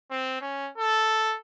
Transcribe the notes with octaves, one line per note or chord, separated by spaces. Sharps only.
C4
C#4
A4